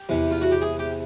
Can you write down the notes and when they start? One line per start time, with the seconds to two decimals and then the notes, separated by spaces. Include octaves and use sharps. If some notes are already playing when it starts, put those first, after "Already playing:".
Already playing: G4
0.09 E2 C3 E3
0.31 F4
0.41 F#4
0.51 G4
0.62 G#4
0.79 G4